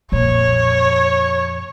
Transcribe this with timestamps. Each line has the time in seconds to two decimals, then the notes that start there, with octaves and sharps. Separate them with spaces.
0.12 F2 A#2 C#5